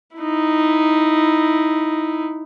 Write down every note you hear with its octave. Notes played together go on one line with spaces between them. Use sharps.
D#4 E4